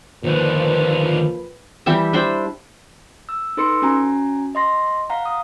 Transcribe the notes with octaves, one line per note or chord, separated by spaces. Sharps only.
D#2 A#2 D3 F3 B4
E3 G3 G4 E5
D4 E4 C5 G5
E6
D#4 A4 B4 C6 E6 C#7
C#4 F#4 G#5 A#5
D#5 C6 A#6
F5 F#5 A#5
D#6